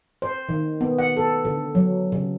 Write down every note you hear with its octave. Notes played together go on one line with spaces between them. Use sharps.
C5
D#3
B3
F#5
A4
D3
F#3
C#3